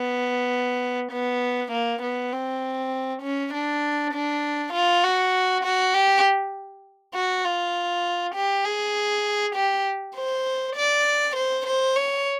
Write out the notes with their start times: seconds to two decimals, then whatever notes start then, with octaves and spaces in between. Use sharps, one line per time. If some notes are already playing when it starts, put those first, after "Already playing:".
Already playing: B3
1.12 B3
1.72 A#3
2.03 B3
2.33 C4
3.22 C#4
3.53 D4
4.14 D4
4.73 F4
5.03 F#4
5.64 F#4
5.94 G4
7.14 F#4
7.45 F4
8.35 G4
8.65 G#4
9.56 G4
10.16 C5
10.76 D5
11.36 C5
11.66 C5
11.96 C#5